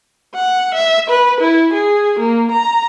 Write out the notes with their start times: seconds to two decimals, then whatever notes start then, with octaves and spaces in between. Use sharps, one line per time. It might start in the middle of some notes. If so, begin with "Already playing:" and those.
0.35 F#5
0.75 E5
1.10 B4
1.40 E4
1.73 G#4
2.19 A#3
2.51 A#5